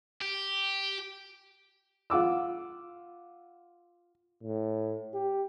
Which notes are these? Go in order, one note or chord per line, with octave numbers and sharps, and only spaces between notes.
G4
F4 F#5 D6 E6
A2
G4